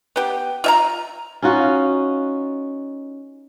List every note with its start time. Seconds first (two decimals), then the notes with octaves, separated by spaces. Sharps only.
0.16 B3 G4
0.64 F4 E5 A#5
1.42 C#4 D#4 F4 F#4